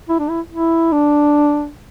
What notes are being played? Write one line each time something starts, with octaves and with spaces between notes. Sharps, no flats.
E4
D4
E4
E4
D4